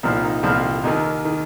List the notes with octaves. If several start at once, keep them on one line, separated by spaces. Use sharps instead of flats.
C2 A#2 F3 D#4
D#4
C2 A#2 F3 C4
D#2 D#3 D#4
D#3